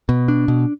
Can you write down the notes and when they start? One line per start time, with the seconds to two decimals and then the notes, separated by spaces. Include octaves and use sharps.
0.09 B2
0.28 D4
0.48 B2